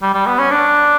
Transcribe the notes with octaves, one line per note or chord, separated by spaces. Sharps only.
G3
G3
B3
C#4
D4